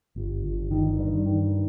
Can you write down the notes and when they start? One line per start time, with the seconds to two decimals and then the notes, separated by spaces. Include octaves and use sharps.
0.16 G1
0.44 G1
0.71 D#3
0.99 G2
1.26 D#3